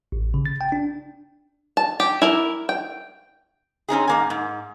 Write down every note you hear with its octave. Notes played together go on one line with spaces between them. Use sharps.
A1
C#3
A6
G5
D4
A5
G4
E4 A#4
G5
C4 C#4 D#4 G#4
G#2 A#3 G#5
G#2